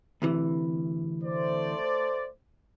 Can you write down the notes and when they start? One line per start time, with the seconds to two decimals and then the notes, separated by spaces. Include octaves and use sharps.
0.22 D2 C3 E3
1.23 A3 C5 D5